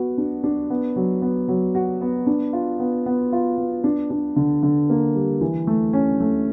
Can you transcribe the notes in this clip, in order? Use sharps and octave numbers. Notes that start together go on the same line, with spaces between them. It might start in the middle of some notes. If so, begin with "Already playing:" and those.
Already playing: B3 F#4
D4
D4
B3
F#3
B3
F#3
F#4
B3
D4
F4
B3
B3
F4
B3
D4
D4
D3
D3
A#3
G3
E3
A3
C#4
A3